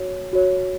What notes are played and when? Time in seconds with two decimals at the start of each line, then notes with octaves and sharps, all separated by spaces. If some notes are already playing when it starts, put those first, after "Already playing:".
Already playing: F#4 C#5
0.33 F#4 C#5